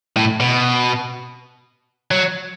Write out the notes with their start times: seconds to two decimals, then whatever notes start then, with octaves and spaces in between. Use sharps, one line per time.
0.16 A2
0.40 B2
2.11 F#3